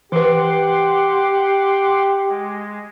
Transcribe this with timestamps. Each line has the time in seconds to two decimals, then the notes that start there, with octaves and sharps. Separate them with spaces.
0.12 E3 G4 B4 F#5 C6 D6
2.29 G#3